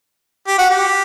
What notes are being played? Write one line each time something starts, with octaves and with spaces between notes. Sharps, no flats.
G4
F#4
G4